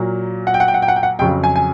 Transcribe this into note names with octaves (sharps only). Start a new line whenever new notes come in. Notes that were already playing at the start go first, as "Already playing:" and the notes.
Already playing: A#2 F#3 A#3
F#5
G5
F#5
G5
F#5
G5
F#5
G5
F#5
F2 C#3 F#3 G5
G#5
G#5